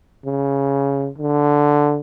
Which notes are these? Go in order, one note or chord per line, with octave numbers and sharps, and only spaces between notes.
C#3
D3